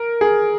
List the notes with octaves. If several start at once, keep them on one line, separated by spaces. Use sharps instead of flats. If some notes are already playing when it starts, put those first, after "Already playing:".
Already playing: A#4
G#4